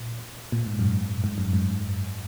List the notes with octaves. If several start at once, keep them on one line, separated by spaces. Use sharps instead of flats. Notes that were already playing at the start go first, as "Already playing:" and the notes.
Already playing: A#2
A#2
G#2
F#2
G#2
F#2
G#2